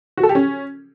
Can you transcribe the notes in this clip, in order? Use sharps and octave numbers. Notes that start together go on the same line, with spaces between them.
F#4
A4
G4
C#4